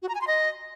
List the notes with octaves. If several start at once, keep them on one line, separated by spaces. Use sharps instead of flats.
F#4
A#5
G#5
C6
D#5